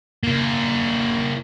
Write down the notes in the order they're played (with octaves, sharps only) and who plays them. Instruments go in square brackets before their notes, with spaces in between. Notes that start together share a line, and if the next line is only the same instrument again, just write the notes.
[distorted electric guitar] A#3 E4